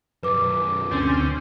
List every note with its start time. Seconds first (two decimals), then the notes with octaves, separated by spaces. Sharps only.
0.23 F#2 B2 B4 D6
0.91 D2 C4 C#4